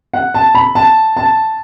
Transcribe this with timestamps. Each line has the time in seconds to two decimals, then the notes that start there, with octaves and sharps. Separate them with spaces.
0.14 F#5
0.34 A5
0.55 B5
0.75 A5
1.17 A5